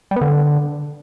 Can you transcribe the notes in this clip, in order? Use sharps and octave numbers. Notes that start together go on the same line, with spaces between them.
G3
B3
D3